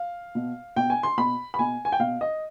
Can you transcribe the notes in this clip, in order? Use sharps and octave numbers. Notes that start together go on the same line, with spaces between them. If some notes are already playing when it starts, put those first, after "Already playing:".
Already playing: F5
B2
B2 G5
G#5
C6
B2 B5
B5
B2 G#5
G#5
G5
B2 F5
D#5